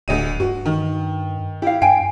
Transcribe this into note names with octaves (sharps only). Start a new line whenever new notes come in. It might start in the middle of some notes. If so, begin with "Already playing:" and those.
D1 D2 D#5 D#7
G2 F#4
D#3
E4 G4 F5
G2 F5 G5 G#5 D7